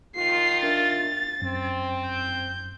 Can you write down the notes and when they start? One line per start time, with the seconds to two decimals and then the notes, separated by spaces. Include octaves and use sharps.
0.16 D#3 F4 C7
0.63 D4 A#4 E5 A6
1.42 F#2 C4
2.07 G6